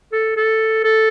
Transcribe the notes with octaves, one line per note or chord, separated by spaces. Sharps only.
A4
A4
A4